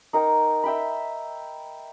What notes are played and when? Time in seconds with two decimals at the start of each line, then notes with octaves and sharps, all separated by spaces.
0.13 D#4 A#4 G5
0.64 E5 G5 B5